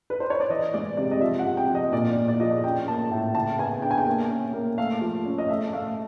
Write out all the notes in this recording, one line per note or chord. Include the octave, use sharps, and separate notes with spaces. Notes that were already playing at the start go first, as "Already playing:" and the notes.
B4
C5
C#5
D5
E3 D#5
G#3 D5
C3 D5
D#5
F3 E5
F#5
C3
G5
F3
D#5
A#2 D5
A#2
D5
F3 D#5
D5
C#4 G5
A#3 A5
A2
C#3 A5
B3 G#5
D4 G5
G#5
G5
A#3
C#4
A#3
A3 F5
F3
C#4
D#5
A3 E5
A3 F5